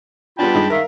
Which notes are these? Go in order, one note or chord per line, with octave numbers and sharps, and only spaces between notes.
G3 B3 D4 F4 G5 A5 B5
G2 G#3 D#4
D#3 A#4 E5 F5